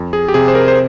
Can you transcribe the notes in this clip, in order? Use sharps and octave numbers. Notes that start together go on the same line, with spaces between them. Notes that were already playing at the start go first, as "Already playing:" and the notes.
Already playing: F2
G#4
G4
C3 G#4
C5
A#4
C5